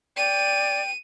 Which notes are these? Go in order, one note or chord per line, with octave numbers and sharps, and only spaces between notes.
D5 G5 D#7